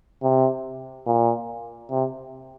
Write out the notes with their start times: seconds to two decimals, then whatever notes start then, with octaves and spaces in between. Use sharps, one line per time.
0.23 C3
1.07 A#2
1.91 C3